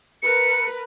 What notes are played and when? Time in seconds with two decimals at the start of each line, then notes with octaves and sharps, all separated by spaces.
0.23 A#4 B4 C#7